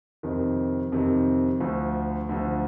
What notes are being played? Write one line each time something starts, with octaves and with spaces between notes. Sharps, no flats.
F2 C3 D#3
F2 C3 D#3
D2 D3 F3
D2 D3 F3